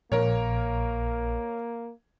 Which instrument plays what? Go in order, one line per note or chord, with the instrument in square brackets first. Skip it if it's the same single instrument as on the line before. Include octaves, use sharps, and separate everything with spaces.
[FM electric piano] A#1 [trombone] A#3 [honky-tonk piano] A#4 C#5